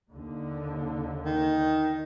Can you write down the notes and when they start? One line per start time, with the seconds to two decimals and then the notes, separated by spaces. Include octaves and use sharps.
0.13 D#2 D3
1.25 D#3